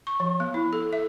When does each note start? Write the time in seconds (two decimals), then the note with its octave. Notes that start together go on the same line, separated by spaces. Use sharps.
0.07 C#6
0.20 F3
0.40 B3
0.54 E4
0.73 A4
0.93 E5